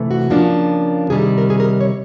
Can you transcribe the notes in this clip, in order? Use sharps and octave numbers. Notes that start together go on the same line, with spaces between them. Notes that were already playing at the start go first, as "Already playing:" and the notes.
Already playing: C3 E3 A3
F#4
C#3 F3 A#3 D4
C3 D#3 G3 G#4
A#4
G#4
A#4
C#5